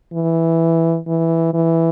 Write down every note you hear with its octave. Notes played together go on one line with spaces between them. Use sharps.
E3
E3
E3